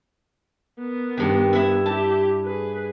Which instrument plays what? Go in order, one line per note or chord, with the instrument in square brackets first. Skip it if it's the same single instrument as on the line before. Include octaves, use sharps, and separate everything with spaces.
[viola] B3 A#4
[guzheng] G2 D#3
E4 E5
[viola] E4 G4 [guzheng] A5
[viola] G#4 B4